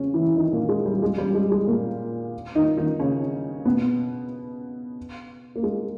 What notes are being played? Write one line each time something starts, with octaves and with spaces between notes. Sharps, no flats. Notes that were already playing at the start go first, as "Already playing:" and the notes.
Already playing: C#3 C#4
E3 E4
D#3 D#4
A#2 A#3
G#3
G3
G#3
G3
G#3
G#3
A#2 A#3
D#3 D#4
D#3 D#4
C#3 C#4
B2 B3
A#3
G#3